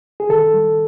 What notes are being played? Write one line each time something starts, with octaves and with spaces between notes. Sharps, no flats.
G#4
D#3 A4
G3